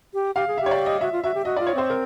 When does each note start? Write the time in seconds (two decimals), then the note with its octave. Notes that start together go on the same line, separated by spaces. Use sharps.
0.14 G4
0.35 G4 F5
0.47 G#4
0.58 G4 E5
0.66 C#5
0.71 D5
0.86 D#5
1.01 F#4 E5
1.12 F4
1.24 F#4 E5
1.35 G4
1.45 F#4 D#5
1.56 F4 D5
1.67 C#5
1.75 C4 C5
1.90 A#4